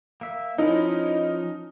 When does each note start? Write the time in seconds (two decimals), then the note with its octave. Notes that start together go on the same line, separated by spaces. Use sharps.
0.21 A#3 E5
0.58 F3 C#4 D#4 E4 A#4